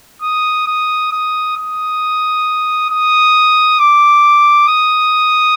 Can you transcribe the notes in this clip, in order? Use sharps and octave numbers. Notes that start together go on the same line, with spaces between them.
D#6
D#6
D#6
D#6
D#6
D6
D#6